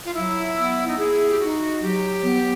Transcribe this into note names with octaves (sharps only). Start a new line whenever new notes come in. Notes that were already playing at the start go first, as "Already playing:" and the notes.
F4
F#3 E4
B3
D#4
E4 G#4
G4
D#4 F#4
F#3 G4
B3